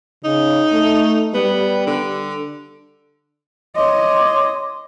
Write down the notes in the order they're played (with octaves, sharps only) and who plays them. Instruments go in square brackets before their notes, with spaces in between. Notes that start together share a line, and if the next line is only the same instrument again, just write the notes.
[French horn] C#3 [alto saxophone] D#4
[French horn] A3
[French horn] G3 [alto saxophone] B3
[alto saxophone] D3
[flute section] C#5 C6 D6 [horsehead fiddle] D#5